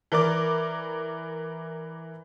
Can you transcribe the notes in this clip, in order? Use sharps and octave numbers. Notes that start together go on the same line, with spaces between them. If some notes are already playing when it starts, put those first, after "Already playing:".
E3 A#4 D5 D6